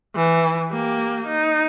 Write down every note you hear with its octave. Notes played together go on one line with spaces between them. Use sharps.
E3
A#3 G4
D#4